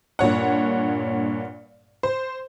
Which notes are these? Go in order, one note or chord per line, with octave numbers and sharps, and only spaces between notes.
G2 A#2 C#5 F#5
C5